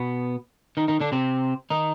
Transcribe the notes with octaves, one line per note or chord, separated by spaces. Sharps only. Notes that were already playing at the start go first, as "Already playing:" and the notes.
Already playing: B2 B3
D#3 D#4
D#3 D#4
D3 D4
C3 C4
D#3 D#4